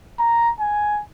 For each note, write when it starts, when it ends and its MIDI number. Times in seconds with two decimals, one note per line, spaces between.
0.19 0.51 82
0.60 1.01 80